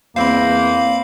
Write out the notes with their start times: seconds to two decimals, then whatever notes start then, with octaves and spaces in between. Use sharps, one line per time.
0.16 E2 A#3 C4 C5 F5 B5